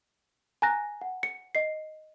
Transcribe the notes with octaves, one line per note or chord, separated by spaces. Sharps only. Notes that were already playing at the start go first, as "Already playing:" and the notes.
G#5 A#5 F#6 A#6
F#5
C#7
D#5 C7